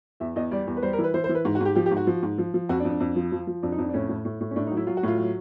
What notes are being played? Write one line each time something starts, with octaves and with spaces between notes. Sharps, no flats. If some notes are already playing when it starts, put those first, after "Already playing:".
E2 E5
E2 D#5
G3 D5
E2
B4
G3 C5
A#4
E3
B4
E3 C5
C5
E3
B4
G#2
F#4
G#2 G4
F3 G4
G4
G#2
F#4
F3
G#2
F3
F3
F2 F#4
D4
F2
D4
F2
F3
F3
F3
F2 D4
D#4
F2 D4
D4
A2 C#4
A2
A2
A2
C#4
A2 D4
D#4
F#3
E4
F#3 F4
F#4
A2 F4
F#3